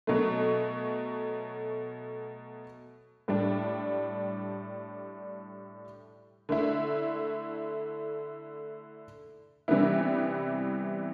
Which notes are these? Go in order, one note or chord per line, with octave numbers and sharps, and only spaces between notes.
B2 F#3 A3
A2 G3 D4
D3 A3 E4
C3 E3 G3 B3 E4